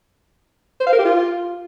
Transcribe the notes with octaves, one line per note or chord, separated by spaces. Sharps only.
C5
F5
A#4
G4
F4